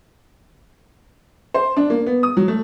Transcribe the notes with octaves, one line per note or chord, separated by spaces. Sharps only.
C5
D4
A#3
B3
D#6
F#3
A3